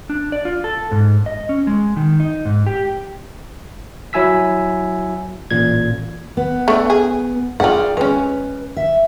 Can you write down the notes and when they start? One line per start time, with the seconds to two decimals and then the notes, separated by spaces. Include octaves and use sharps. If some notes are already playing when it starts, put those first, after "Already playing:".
0.10 D4
0.32 D5
0.45 F4
0.64 A4
0.91 G#2
1.26 D#5
1.49 C#4
1.67 G#3
1.97 D#3
2.20 D#4
2.45 G#2
2.66 G4
4.13 F#3 E4 G#5 E6 B6
5.51 A1 A#2 G#6
6.37 B3
6.68 A3 D4
6.90 G#4
7.60 F4 G#4 D5 F#5 G5
7.97 G#3 C#4 B4
8.77 E5